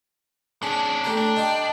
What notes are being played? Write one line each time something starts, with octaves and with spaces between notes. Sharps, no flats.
C#4 D4 G#4
A2 G4 A#5
D4
D#4 G4 C6